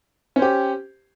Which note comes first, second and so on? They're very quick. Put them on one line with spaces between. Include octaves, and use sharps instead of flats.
C#4 C5 G4